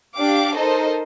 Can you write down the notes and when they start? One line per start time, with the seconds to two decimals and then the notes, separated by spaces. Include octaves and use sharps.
0.16 D4 G4 F5 D6
0.57 D#4 A4 A#4 C5 D#5